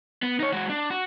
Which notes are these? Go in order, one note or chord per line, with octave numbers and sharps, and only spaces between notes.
B3
D#4 C#5
G#3 F#4
D4
F#4